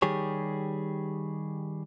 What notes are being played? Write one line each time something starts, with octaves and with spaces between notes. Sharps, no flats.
D#3 G3 G4 G#4 C#5